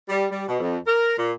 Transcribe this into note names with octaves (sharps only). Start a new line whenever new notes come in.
G3
G3
B2
F2
A#4
A#2